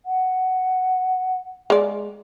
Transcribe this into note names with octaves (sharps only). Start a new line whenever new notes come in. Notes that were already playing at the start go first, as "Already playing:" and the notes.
F#5
G#3 D5